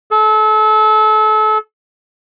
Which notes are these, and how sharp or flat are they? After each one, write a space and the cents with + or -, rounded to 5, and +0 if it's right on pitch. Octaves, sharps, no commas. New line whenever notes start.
A4 -30